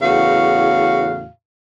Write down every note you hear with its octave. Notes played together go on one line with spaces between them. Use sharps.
E2 A2 C#3 F#4 F5